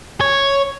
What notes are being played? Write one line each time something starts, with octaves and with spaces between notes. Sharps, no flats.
C#5